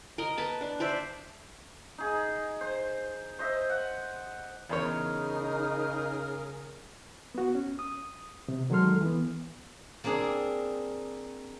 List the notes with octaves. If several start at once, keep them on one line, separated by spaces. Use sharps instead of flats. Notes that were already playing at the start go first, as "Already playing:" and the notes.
A#4 D#5
B4 A5
D4
C5 D5 E5
D#4 G#4
C5
C5 D#5 E5
F#5
E2 C#3 D#4 G#4 A#4 C5 C#5
B3 F#4
C#4
D#6
C3
D#3 F#3 G#3 A4 C6 F6
E3 B3
A#3 C4 D4 G#4